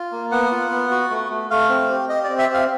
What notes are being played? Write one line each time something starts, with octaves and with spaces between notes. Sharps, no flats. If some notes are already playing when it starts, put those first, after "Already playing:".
Already playing: F4
A#3
B3 F#5
F4
B3
F#4
A3
A3
A3 F5
C4
G4
G4 D#5
C4 D5
E5
G4
F5